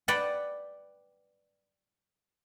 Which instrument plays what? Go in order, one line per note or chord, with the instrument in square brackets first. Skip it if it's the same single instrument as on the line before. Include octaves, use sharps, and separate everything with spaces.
[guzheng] B4 D5 F#5 G5 A5